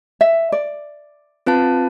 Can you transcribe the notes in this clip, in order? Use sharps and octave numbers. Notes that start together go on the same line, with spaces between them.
E5
D5
C4 F4 B4 F5 A5